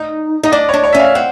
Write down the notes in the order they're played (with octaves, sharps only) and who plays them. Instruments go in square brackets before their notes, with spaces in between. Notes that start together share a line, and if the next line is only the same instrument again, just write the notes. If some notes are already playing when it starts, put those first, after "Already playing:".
Already playing: [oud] D#4
[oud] D#4 [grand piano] D#5
[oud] D4 [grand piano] D5
[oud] D4 [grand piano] C#5
[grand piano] C#5
[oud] C#4 [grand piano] E5
[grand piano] F5
[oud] C4 [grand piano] F#5